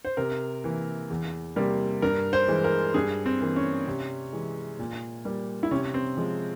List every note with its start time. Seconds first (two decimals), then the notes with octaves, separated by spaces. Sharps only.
0.05 C5
0.17 C3 A#4
0.64 E3 A#3
1.10 E2
1.56 C3 G3 A#3
2.02 G2 A#4
2.33 C5
2.48 E3 G#3
2.64 A#4
2.94 G2 G#4
3.26 C4
3.41 E3 A#3
3.56 C#4
3.87 C3
4.33 E3 G#3
4.79 A#2
5.25 G3 A#3
5.63 E4
5.71 C3 C#4
5.94 C4
6.17 F3 G#3